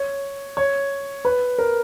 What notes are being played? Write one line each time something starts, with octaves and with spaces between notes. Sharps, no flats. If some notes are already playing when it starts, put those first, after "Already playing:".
Already playing: C#5
C#5
B4
A#4